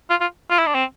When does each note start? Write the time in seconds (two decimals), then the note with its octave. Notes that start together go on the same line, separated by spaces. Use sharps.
0.10 F4
0.21 F4
0.50 F4
0.59 E4
0.67 D4
0.75 C4